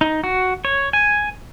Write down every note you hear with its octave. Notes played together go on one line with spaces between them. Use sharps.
D#4
F#4
C#5
G#5